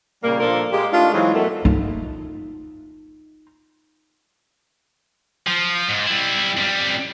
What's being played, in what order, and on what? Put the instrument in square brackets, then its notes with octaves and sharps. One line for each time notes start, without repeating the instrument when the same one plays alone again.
[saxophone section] A#2 C#3 G3 A#3
A#2 F3 D4 F4 A4 A#4
G#3 A#3 G4
A3 D4 D#4 F4
E3 F#3 G#3 C4 D#4 F4
F#2 B2 A3
[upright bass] D#4 F4
[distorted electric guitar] F3
G#2
G3 E4
F2 G3